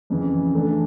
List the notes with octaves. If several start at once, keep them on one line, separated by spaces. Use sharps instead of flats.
F2 C#3 E3
E3 A3 D4